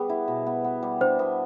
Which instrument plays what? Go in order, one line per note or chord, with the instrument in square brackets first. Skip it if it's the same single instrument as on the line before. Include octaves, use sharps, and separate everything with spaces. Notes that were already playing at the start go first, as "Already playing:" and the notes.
Already playing: [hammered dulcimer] G3 B3 [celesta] G#4
[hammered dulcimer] E4
B2
B3
B3
G3
[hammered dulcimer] D4 [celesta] C5
[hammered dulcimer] B3